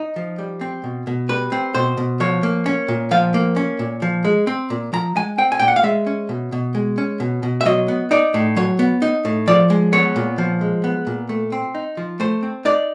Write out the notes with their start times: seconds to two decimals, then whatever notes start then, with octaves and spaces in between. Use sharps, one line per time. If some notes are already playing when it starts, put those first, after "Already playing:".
Already playing: D#4
0.16 F3
0.39 G3
0.61 C4
0.84 B2
1.07 B2
1.29 G3 B4
1.52 C4
1.74 B2 C5
1.97 B2
2.20 F3 C#5
2.43 A#3
2.66 C#4
2.88 A#2
3.11 F3 F5
3.34 A#3
3.56 C#4
3.79 A#2
4.02 F3
4.24 G#3
4.47 C4
4.70 A#2
4.93 F3 A#5
5.15 G#3 G#5
5.38 C4 G5
5.52 G#5
5.59 A#2 G5
5.68 F#5
5.76 F5
5.83 G#3 E5
6.07 C#4
6.29 B2
6.52 B2
6.75 G#3
6.98 C#4
7.20 B2
7.43 B2
7.61 E5
7.65 F#3 D#5
7.88 B3
8.11 D#4 D5
8.34 A2
8.56 F#3 C#5
8.79 B3
9.02 D#4
9.25 A2
9.47 F3 D5
9.70 G#3
9.92 B3 C#5
10.16 A#2
10.38 F3
10.61 G#3
10.84 B3
11.07 A#2
11.29 A3
11.52 C4
11.75 D#4
11.97 F3
12.20 A3 C5
12.43 C4
12.65 D#4 D5